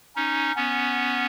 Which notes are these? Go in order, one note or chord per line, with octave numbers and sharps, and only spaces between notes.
C#4 D#4
B3 C#4